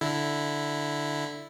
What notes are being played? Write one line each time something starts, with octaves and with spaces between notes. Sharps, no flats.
D3 E4